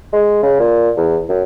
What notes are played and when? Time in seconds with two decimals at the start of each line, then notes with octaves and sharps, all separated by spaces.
0.13 G#3
0.43 C#3
0.60 A#2
0.97 E2
1.29 F#2